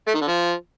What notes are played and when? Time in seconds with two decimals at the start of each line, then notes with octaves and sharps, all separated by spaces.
0.08 A3
0.14 D#3
0.21 D3
0.28 F3